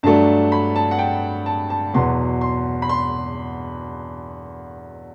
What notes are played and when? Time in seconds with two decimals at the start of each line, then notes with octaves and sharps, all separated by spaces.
0.03 G2 F#3 A3 D4 A5
0.52 B5
0.76 A5
0.91 F#5
0.99 G5
1.46 A5
1.70 A5
1.94 E2 B2 F#3 B3 C6
2.41 C6
2.82 B5
2.89 C6